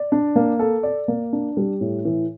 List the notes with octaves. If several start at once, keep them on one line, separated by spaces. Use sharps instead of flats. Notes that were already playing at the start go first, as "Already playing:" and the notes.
Already playing: D5
D4
A#3
A4
D5
A#3
D4
G3
A2
E3